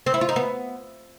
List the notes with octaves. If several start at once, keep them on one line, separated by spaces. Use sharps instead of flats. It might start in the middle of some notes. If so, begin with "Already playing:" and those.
C4
E4
F4
D#4
B3